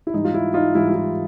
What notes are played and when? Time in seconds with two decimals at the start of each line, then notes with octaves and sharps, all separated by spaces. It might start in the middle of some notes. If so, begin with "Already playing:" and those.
0.07 E4
0.14 G#2 E3 G3 D#4
0.25 F4
0.34 E4
0.54 D#4 F4
0.75 G#2 E3 G3 E4
0.89 F4
0.95 E4